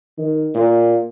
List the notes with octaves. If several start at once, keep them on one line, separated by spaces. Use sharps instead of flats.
D#3
A#2